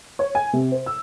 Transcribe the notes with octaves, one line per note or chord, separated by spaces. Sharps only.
C#5
G#5
C3
C5
E6